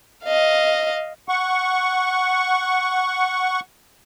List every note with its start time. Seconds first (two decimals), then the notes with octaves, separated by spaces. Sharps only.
0.24 D#5 F5
1.28 F#5 C#6